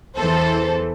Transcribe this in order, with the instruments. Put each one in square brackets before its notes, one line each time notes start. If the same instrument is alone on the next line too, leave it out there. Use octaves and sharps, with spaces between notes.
[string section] E2 E3 A4 C5